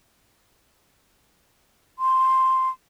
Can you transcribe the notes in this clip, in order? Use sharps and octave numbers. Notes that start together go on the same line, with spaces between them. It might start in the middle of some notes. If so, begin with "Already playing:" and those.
C6